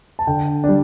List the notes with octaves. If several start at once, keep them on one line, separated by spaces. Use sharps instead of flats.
A5
D3 G5
G3 D4